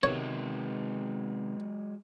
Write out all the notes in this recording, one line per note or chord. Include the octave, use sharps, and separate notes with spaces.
C3 D#3 F#3 G#3 B3 C#5